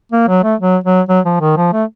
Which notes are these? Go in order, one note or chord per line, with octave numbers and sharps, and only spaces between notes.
A#3
F#3
A3
F#3
F#3
F#3
F3
D#3
F3
A3